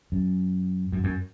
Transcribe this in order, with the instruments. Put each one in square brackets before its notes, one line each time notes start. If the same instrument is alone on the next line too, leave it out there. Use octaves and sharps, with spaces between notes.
[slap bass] F#2
F#2
F#2